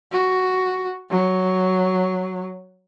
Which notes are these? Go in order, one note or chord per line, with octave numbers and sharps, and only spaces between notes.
F#4
F#3